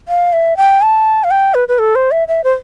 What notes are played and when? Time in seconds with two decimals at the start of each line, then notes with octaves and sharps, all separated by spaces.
0.08 F5
0.33 E5
0.57 G5
0.82 A5
1.24 F5
1.31 G5
1.54 B4
1.68 B4
1.79 A4
1.95 C5
2.11 E5
2.28 E5
2.44 C5